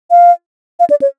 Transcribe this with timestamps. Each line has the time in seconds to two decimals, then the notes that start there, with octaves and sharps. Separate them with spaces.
0.11 F5
0.80 F5
0.90 D5
1.02 C#5